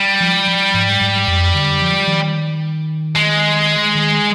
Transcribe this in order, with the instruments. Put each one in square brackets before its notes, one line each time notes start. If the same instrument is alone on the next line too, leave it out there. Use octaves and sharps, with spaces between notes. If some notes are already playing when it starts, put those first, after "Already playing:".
Already playing: [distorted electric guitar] G3
[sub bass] F3
F3
G#2
G#2
F2
D3
F3
D#3
[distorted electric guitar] G#3
[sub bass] D#3